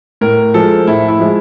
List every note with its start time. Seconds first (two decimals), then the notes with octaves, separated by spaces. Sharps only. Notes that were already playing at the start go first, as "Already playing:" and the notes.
0.21 A2 A#4
0.54 F3 G#3 A4
0.87 A2 E4
1.08 E4
1.19 F3 G#3